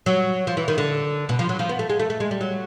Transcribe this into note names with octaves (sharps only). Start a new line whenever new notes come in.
F#3
F3
E3
D#3
D3
B2
F3
F#3
F3
B3
A3
G#3
A3
A3
G#3
G3
F#3